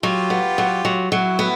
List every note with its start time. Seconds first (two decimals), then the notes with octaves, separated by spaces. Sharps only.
0.03 F#3 F4 G4
0.30 B3
0.58 F#3
0.85 F#3
1.12 F#3 E4 F#4
1.39 B3